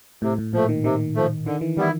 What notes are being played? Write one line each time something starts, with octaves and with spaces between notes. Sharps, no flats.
A2 C3
A2
A#2 F3 A3
D#3
C3 D#3
F3 A3
D3 D#3
E3
D#3 G3 B3 E4